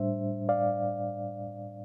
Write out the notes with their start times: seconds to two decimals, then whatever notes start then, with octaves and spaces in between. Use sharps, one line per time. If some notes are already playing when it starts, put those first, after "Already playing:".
Already playing: A2 G3 D4 C5 E5
0.49 D5 F5